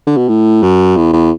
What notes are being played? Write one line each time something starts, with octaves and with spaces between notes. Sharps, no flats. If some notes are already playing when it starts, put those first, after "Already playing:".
D3
B2
A2
F#2
E2
E2